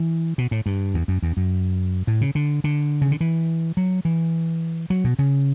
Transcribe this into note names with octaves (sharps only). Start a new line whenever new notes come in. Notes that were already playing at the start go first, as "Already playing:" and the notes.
Already playing: E3
B2
A2
G2
E2
F#2
E2
F#2
A2
C#3
D3
D3
C#3
D3
E3
F#3
E3
F#3
B2
C#3